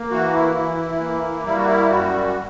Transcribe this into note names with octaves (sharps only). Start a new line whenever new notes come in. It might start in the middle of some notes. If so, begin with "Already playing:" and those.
Already playing: A#3
E3 F#4
E4
E3
A#3
G3 E4
F#4
E4
F#2 F#4